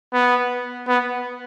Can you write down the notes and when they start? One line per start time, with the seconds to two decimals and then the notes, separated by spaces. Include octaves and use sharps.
0.13 B3
0.87 B3